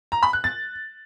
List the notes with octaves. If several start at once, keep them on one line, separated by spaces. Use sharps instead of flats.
A#5
B5
F#6
A6